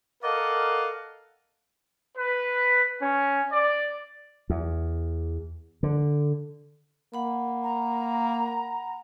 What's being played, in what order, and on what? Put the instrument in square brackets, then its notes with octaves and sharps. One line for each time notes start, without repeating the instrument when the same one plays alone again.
[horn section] A4 A#4 D5 D#5 F5 F#5
[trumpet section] B4
C#4
D5
[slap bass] E2
D3
[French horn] A#3 [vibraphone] F#5 B5
[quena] A#5